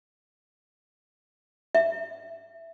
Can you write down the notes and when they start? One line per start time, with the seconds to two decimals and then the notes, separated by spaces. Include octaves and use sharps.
1.75 E5